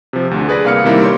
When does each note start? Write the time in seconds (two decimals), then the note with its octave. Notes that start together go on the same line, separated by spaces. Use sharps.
0.13 C3 F3
0.31 D2 D3
0.48 G#4 B4 D5 A#6
0.64 C2 A#3 F5 F6 C#7
0.84 C3 D#3 G3 A#3 E4
1.01 C#5 C6 D6